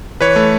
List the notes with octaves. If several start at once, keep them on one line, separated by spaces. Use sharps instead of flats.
E3 B4 C#5
A3